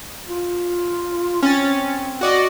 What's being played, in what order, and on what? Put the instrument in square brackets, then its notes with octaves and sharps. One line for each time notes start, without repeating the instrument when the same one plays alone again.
[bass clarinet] F4
[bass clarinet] C4 [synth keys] C#4 A6
[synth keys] F#4 D5 D#5